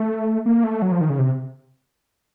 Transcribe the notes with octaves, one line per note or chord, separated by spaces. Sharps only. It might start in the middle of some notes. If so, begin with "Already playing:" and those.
Already playing: A3
A#3
A3
F#3
F3
D#3
C#3
C3